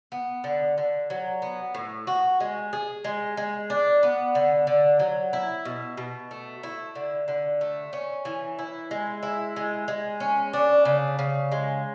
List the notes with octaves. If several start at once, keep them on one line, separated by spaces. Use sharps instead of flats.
B3
D3
D3
F#3
B3
A2
F#4
G#3
G#4
G#3
G#3
D4
B3
D3
D3
F#3
E4
B2
B2
A3
E4
D3
D3
A3
C#4
E3
E4
G#3
E4
G#3
G#3
C#4
D4
C#3
C#3
G#3